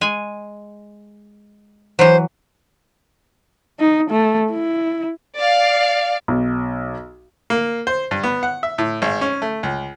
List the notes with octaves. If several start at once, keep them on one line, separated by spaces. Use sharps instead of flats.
G#3 G#5
E3 F#3 C5
D#4
A3
E4
D5 F5
B1
A#3
C5
G2
B3
F#5
E5
A2
G#1
C#4
A3
C#2